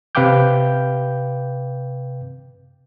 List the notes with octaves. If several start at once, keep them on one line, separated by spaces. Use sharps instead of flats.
C3 B4 F5 G5 D6 G6